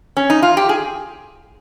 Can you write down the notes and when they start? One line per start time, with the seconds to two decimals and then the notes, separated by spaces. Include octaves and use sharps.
0.17 C#4
0.30 D#4
0.43 F4
0.57 G4
0.69 G#4